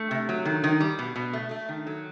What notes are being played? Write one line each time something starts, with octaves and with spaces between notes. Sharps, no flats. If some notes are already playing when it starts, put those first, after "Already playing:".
Already playing: A3
C3
F#3
D#3
D#3
G3
B2
B2
A3
A3
D#3
F#3